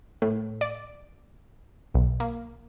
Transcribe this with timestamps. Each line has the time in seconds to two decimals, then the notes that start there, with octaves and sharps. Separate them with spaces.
0.22 A2
0.61 D5
1.94 B1
2.20 A#3